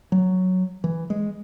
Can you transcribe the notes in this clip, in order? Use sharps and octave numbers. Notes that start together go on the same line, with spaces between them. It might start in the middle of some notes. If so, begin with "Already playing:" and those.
F#3
E3
G#3